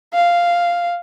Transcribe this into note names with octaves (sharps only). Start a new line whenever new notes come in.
F5